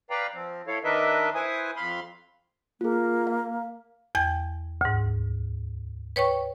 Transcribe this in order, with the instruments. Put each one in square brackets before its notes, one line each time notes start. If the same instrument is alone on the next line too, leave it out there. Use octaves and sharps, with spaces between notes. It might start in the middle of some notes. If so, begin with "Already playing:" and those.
[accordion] B4 D5 F5 G5 A#5
F3 C4
E4 A4 C#5 F5
D#3 D4 A#4 B4 D#5 E5
E4 B4 C5 G#5 D#6
F2 F5 B5 C6
[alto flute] A#3 [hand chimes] F4 G#4
[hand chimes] F5
[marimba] E2 G5 G#6
D2 G#2
B4 C#5 G5 C#6